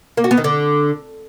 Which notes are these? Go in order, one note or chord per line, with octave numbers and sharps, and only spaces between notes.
A#3
F#4
B3
D#3
D3